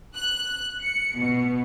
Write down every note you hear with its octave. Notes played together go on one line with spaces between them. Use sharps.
F#6
C#7
B2